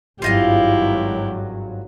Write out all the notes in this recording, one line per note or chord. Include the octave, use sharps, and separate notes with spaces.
G#1 G2 F#3 E4 F4 G4 D#5 F5